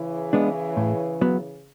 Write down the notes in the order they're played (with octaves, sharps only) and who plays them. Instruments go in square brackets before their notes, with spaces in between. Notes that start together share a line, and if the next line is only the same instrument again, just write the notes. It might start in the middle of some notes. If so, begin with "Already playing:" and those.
Already playing: [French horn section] C#3 E3
[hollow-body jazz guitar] G#3 B3 D4
A2
F#3 B3